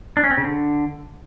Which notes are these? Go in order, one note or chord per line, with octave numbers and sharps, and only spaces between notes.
D4
C#4
C4
C#3
D3